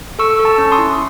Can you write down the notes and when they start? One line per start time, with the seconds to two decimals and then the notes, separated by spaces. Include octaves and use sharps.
0.19 A4 C#6 E6
0.40 A4
0.45 A5 C#6
0.58 C#4
0.72 C6 D#6
0.78 E4